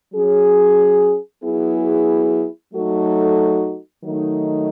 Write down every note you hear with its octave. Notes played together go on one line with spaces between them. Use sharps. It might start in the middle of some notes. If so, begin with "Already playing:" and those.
F#3 C#4 G#4
F#3 B3 E4 G#4
F#3 A3 D#4 F#4 A4
D#3 F#3 A3 D#4